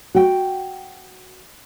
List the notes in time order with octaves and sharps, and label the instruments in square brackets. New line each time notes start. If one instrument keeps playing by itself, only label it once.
[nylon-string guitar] F#4 G5